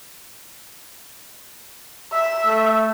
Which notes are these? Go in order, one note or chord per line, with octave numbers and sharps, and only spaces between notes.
E5
A3